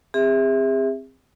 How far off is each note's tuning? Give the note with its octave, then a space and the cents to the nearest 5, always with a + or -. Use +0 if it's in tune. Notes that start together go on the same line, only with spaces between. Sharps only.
C4 +0 G#4 -40 E5 -10